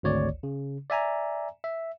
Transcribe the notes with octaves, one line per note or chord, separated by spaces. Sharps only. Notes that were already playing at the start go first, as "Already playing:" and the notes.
G#1 D2 C#5 D5
C#3
D5 E5 G#5 A#5
E5